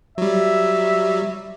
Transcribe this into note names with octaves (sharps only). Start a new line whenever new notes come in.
F#3 G3 E5